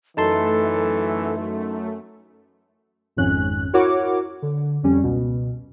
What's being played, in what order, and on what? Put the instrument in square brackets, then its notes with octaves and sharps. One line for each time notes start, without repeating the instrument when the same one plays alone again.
[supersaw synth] F#2 A3 [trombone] E3 [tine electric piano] D#4 A5 C6 [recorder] A4
[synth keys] G#1 F2 G#2 C#4 F#6
E4 F#4 A#4 C#5 F#5 D6
D3
F2 G3 C#4
C#2 B2